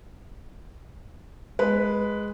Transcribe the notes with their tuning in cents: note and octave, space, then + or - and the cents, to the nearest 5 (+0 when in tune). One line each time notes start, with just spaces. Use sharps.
G#3 +0 B4 +0